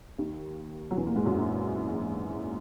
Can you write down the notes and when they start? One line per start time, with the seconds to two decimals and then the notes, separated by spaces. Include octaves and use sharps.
0.18 D#2 D#3
0.91 F#3
0.97 E2 E3
1.06 A#2 A#3
1.16 G#2 G#3
1.26 F#2 F#3
1.36 A#1 A#2